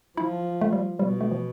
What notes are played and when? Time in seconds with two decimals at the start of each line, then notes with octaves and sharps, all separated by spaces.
0.17 F3 E4
0.61 A3
0.73 G3
0.99 B2 G3
1.21 A3
1.31 F3